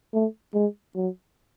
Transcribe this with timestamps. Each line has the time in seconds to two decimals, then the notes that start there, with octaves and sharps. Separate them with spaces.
0.13 A3
0.54 G#3
0.95 F#3